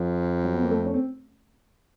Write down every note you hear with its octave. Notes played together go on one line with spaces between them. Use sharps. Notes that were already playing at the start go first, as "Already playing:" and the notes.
Already playing: F2 F3
F#3
B3
A#3
A3
C#4
C4